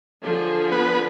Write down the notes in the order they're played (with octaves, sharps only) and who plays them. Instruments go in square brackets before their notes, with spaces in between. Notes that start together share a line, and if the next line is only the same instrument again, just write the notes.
[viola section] D3 F3 G#4
[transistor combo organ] B3 B4